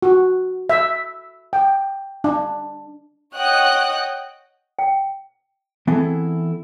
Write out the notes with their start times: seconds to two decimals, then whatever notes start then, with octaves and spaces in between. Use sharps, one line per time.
0.02 F#4
0.69 E5
1.53 G5
2.24 D4
3.34 C#5 D#5 F#5 G5 D#6 F#6
4.79 G5
5.87 E3 B3 C4 E4 G#4 A4